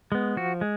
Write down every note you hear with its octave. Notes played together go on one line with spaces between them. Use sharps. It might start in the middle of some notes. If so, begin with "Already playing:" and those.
G#3 B3
F3 F#4
G#3